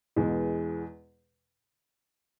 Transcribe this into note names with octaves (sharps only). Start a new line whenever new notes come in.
E2 B2 G#3